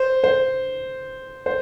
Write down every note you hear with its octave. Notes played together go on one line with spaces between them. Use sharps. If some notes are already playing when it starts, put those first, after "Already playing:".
Already playing: C5
C5
C5